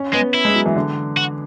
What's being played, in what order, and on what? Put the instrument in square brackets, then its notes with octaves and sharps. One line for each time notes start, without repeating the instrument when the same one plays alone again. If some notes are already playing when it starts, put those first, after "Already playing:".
Already playing: [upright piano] C#4
[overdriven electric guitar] G#3 [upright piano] B3
[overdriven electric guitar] E4
[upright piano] G#3
F#3
E3
D3
[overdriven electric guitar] F#4